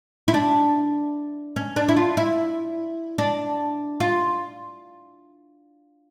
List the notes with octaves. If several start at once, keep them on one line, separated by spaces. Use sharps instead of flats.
E4
D4
C#4
D4
E4
F4
E4
D4
F4